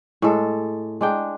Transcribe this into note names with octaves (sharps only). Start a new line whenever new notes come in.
A2 G#3 A4
G#3 D4 G5